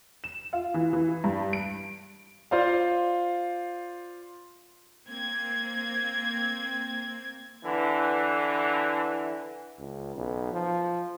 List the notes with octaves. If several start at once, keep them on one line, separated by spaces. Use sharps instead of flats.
E7
F4
E3
E3
G2
D7
F4 C5 D5 F5
A#3 C4 G#6
D3 E3
C#2
B1
F3